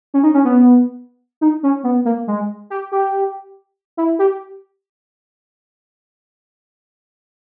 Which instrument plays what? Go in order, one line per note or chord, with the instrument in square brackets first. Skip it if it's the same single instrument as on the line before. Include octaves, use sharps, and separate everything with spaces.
[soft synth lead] C#4
D#4
C#4
B3
D#4
C#4
B3
A#3
G#3
G4
G4
E4
G4